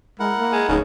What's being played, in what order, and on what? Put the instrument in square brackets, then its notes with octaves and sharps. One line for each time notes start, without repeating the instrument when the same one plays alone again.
[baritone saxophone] G#3 [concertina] E4 A#4 F#5
[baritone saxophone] A#3
[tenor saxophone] G#3
[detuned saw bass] D1 [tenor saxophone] C#3 [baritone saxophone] D#4